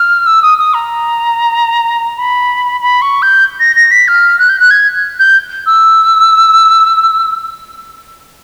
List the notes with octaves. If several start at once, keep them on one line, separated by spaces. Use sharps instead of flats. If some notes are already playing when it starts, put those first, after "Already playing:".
Already playing: F6
E6
D#6
D#6
A#5
B5
B5
C#6
G6
A#6
A#6
B6
F6
F#6
G6
F#6
G#6
G6
E6